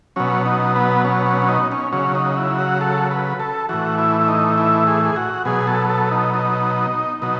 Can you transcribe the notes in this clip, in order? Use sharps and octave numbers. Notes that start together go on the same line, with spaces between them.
B2 F#3 C#4
D#4
B3
C#4
C#4
C#4
D#4
C#4
C#3 F#3 C#4
D#4
E4
F#4
A4
B4
A4
A2 E3 F#4
E4
E4
D#4
E4
G#4
G#4
F#4
B2 F#3 G#4
A4
A4
D#4
D#4
B2 F#3 D#4